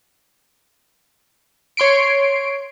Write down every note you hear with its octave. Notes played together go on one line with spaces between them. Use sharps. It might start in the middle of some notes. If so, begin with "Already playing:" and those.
C#5 C6 C7 D7